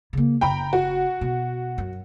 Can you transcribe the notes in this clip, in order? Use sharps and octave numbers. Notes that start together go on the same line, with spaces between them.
C#3 A#3
F#1 G5 A#5 B5
F#4
B2
F#2